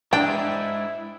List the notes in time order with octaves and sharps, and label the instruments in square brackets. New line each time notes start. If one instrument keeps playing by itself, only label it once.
[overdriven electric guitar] G#3 A#5 [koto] D4 [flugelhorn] E4 [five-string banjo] G5